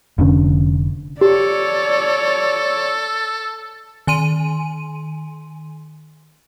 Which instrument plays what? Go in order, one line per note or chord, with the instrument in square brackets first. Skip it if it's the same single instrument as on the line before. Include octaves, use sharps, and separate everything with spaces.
[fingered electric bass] F1 D3 C#4
[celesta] G4 [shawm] A4 [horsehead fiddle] C#5 D5
[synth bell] D#3 G#5 C6 D#7